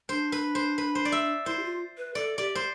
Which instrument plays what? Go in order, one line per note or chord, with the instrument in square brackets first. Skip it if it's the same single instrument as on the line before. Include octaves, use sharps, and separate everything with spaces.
[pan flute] D4 [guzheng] C5
[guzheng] B4
C5
B4
C5
D5
E5
[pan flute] E4 [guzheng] C5
[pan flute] G4
F4
B4
[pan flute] A4 [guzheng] D5
[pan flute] G4 [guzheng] D5
[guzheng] C5